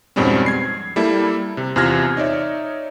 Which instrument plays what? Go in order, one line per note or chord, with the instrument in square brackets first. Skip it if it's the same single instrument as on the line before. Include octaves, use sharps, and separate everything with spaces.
[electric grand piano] F2 G#2 B2 G3 C4 C#4
G#6 C7
G3 A#3 E4 A4
C3
E2 C3 F4 F6 G#6 A#6
D#4 C#5 D5 E5